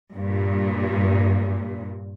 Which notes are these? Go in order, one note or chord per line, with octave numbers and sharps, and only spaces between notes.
G2 A#2